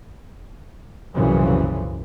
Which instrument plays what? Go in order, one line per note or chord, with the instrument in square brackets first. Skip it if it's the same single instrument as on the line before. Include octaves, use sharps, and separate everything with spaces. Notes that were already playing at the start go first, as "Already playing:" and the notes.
[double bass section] C2 F#2 A#2 C#3 E3 F3